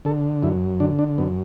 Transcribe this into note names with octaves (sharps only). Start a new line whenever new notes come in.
D3 A4
F#2 E4
D3 D4
D4
F#2 B3